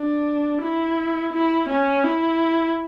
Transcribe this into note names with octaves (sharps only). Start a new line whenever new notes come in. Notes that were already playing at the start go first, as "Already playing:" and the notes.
Already playing: D4
E4
E4
C#4
E4